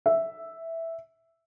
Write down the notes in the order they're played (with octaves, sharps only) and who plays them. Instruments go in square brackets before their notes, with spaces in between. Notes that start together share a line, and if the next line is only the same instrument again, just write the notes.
[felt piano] E5